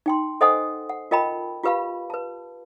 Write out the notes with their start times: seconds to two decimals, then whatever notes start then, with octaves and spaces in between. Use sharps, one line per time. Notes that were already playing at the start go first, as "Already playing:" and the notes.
0.06 D#4 G5 C6
0.41 A4 C5 D#5 F#5 G#5 D#6
0.89 F#5
1.11 F4 A#4 D#5 G5 A5 B5
1.63 F4 G4 B4 F5 B5
2.10 B4 A5